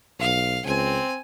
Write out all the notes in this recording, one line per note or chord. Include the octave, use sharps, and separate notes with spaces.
B1 F5
C#2 C4 G#5